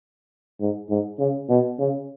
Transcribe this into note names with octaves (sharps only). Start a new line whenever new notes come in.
G#2
G#2
C#3
B2
C#3